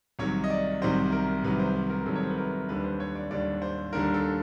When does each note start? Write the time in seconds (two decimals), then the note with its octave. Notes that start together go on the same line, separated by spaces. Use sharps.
0.19 C2 C3 D#3 F#3 C#5
0.44 D#5
0.50 D5
0.81 C2 C3 D#3 F#3 C5
1.12 A#4
1.44 C2 C3 D#3 F#3 B4
1.59 C5
1.75 B4
1.90 A#4
2.06 C2 C3 D#3 F#3 A4
2.15 C#5
2.23 C5
2.30 B4
2.38 A#4
2.69 D#2 D3 G3 B4
2.84 C5
3.00 C#5
3.15 D5
3.31 D#2 D3 G3 D5
3.62 C5
3.93 D#2 D3 G3 A#4
4.14 A4